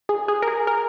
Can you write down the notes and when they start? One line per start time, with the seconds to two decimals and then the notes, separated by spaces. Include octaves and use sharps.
0.09 G#4
0.28 G#4
0.42 A#4
0.48 G#4
0.67 A#4